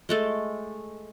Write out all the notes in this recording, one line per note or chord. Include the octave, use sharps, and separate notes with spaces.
G#3 A3 A4